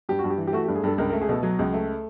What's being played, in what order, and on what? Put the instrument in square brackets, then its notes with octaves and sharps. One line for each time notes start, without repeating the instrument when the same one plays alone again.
[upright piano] G2 [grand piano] G4
[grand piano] F#4
[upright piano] G2
[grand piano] G4
[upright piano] E3
[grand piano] G4
[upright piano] A3 [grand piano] F#4
[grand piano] G4
[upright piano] G2
[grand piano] G#4
[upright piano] G2 [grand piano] A4
[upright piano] C#2 [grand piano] A#4
[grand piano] A#4
[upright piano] A3
[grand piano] G#4
[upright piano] B2 [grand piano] A4
[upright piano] F#3
C#2
A3